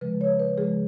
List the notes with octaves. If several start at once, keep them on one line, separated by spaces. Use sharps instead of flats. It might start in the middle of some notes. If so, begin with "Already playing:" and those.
C#3 F3 G#3 B4
C#5
B4
C#3 F3 G#3 G#4